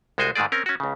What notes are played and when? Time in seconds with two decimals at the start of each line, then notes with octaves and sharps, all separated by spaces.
0.18 C2 G#3 F#4 C5 G#5
0.35 G#2 D#3 G#3 A3 G#4 D5
0.52 C4 C#4 A#4
0.66 C#4 F#4
0.80 C#2 C#3